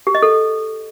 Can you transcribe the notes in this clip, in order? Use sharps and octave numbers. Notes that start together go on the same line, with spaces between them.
G4
D#5
A4